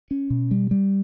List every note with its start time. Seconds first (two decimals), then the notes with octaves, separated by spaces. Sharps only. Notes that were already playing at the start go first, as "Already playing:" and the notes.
0.11 C#4
0.30 B2
0.51 G3
0.71 G3